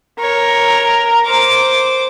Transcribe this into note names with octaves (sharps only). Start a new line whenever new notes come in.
A#4 C#5
C5 D6